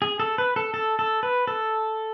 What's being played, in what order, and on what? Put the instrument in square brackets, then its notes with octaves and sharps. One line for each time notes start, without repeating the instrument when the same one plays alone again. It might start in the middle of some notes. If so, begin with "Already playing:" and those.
[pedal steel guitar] G#4
A4
B4
A4
A4
A4
B4
A4